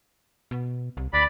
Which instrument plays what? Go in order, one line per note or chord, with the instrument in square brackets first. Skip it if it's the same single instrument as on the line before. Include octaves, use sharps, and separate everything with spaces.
[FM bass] B2
C2
[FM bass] D2 [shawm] D5 [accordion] B5